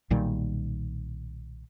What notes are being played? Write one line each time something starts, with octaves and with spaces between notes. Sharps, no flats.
B1 A#2 D#3 G3